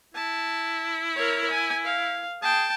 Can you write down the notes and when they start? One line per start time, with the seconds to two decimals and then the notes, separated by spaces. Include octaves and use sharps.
0.14 E4 A5
1.15 A#4 C#5
1.50 G#5
1.84 F5
2.42 G#4 G5 A5